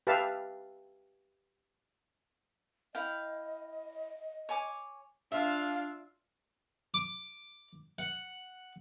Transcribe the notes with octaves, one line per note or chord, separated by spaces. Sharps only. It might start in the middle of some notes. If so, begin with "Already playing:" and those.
G4 B4 E5 F5 A5
E4 D#5 F5 G5
C#5 G#5 D6
D4 F4 E5 F5
D6
F#5